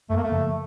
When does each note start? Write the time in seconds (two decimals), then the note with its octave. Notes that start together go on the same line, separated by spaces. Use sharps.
0.10 F#2 A3
0.17 A#3
0.23 A3
0.32 C#3 F3